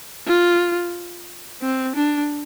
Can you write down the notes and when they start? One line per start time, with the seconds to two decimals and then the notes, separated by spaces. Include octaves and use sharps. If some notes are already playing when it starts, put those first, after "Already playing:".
0.28 F4
1.62 C4
1.96 D4